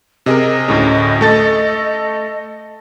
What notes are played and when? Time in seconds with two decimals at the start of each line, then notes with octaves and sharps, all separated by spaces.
0.26 C3 G#4 A#4 D#5
0.68 D2 A2 C#4
1.21 A3 A4 A6